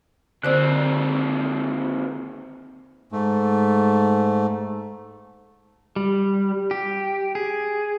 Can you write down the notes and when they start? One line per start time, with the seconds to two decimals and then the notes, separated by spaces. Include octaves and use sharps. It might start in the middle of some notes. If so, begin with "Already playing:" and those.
0.43 D#2 D3 C4 C5 D5
3.12 G#2 A3
5.96 G3
6.71 G4
7.35 G#4